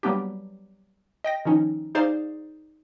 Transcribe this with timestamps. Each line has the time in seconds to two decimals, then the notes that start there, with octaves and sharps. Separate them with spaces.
0.03 F#3 G3 A#3 B3 D4 G4
1.24 D#5 G5 A#6
1.45 D#3 F3 C#4 D#4
1.95 D#4 G#4 C5 D5 F5